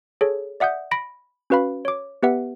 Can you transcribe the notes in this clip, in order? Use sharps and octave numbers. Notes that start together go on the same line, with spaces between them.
G#4 A4 C#5
D5 E5 F#5 D#6 G6
B5 A#6 D7
C#4 F#4 B4 F5 B5
C#5 D6
B3 G4 B4 E5 F#5